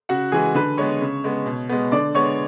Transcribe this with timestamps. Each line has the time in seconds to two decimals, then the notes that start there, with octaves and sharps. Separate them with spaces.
0.09 C#3 F#4 F#5
0.32 E3 G#3 G#4 G#5
0.55 D3 B4 B5
0.77 G#3 B3 C#5 C#6
1.01 C#3
1.24 G#3 B3
1.46 B2
1.69 G#3 B3
1.92 D3 D5 D6
2.15 G#3 B3 C#5 C#6